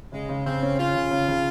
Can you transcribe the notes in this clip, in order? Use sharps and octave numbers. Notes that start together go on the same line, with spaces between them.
C#3 G#3
C#3
C#3 C4
C#4
C#4 F4
C#3
C#3
C#3